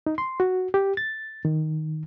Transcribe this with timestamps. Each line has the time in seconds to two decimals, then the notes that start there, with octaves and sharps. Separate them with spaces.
0.06 D#4
0.18 C6
0.40 F#4
0.74 G4
0.97 A6
1.45 D#3